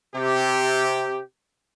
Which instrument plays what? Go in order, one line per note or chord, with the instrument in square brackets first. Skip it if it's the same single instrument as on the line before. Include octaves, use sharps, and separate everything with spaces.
[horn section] C3 G4